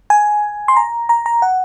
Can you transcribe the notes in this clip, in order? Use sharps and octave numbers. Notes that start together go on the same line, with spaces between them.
G#5
C6
A#5
A#5
A#5
F#5